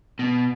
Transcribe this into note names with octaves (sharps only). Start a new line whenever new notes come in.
B2